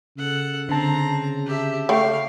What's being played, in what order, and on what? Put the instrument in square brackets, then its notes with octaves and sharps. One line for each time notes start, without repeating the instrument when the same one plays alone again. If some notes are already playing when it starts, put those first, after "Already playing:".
[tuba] C#3 [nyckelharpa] A4 F#5
[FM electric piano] D3 A5 [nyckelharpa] C4 A#5
[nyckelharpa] G4 E5
[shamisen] A3 C#5 G5 [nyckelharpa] F5